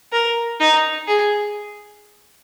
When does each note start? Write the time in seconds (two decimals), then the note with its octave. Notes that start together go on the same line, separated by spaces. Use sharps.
0.12 A#4
0.60 D#4
1.08 G#4